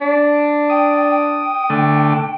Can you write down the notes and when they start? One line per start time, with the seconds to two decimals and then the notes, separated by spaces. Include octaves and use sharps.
0.01 D4
0.69 G5 D#6
1.09 G5
1.70 D3 A3